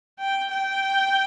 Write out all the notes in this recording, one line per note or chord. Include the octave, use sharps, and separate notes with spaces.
G5
G5